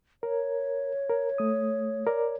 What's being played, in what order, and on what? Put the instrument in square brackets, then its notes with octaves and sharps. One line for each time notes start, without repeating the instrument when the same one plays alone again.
[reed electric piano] A#4 [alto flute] C#5
[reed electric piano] A#4
A3 D#6
A#4 D5